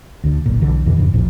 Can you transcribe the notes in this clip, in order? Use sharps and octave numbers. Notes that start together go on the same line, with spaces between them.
D2 D3
F#1 B1 A#2
B1 D3 E3
E2 B2 D3 E3
E2 G2 C3 E3
A1 D#2 A#2 F3